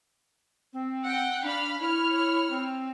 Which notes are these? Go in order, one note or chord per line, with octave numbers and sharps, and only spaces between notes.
C4
F#5 G5
D4 F5 B5 F6
E4 C#5 F6
C4